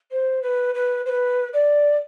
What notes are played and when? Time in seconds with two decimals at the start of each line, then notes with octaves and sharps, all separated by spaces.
0.11 C5
0.42 B4
0.74 B4
1.05 C5
1.09 B4
1.53 D5